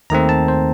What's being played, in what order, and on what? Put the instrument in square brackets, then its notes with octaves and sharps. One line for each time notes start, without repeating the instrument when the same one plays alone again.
[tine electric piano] D#2 D#3 A3 C4 A#5
A5
C5